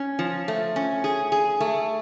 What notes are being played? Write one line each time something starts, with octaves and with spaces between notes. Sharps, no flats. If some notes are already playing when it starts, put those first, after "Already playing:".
Already playing: C#4
F3
A3
C#4
G#4
G#4
A3